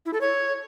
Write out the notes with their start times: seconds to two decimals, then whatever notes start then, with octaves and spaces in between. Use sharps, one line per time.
0.06 E4
0.13 A4
0.21 C#5